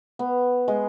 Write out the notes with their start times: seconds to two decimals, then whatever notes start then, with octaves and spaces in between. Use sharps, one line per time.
0.19 B3
0.68 G#3